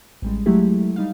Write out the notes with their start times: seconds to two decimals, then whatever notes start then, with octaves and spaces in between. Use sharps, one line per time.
0.22 A1 G3 G#3
0.46 F#3 G#3 A3 E4 G4
0.96 G3 D#4 F5